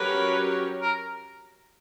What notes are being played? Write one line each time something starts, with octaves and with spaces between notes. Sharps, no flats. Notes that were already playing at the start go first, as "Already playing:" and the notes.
Already playing: F#3 C#4 G4 A#4 B4 C#5
A#4